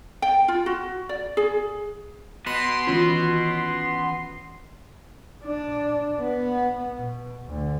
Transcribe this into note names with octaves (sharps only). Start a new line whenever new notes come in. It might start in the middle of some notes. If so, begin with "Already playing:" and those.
G5
F4
F#4
D5
G#4
B3 F#4 B4 C6
D#3 E3 C#4 F4
D4
B3
B2
D2